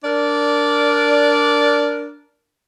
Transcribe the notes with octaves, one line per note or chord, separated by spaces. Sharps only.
D4 A#4 D5